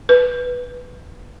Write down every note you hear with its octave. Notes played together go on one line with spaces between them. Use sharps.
B4